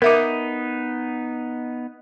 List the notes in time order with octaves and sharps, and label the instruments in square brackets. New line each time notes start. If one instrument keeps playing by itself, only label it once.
[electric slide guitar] B3 D#4 [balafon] A#4 E5 D6